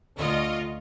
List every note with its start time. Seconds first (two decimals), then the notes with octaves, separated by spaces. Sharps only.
0.17 D2 F4 D#5 C#6